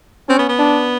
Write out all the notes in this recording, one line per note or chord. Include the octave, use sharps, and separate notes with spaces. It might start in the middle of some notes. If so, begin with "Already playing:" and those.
C4 C#4
B3
B3
D4